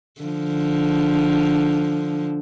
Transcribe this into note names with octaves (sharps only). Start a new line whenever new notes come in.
D3 F3